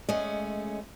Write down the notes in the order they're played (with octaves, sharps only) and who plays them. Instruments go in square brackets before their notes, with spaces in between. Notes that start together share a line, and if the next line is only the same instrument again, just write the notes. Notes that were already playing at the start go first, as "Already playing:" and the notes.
[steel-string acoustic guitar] G#3 A3 C#4 [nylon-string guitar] D#5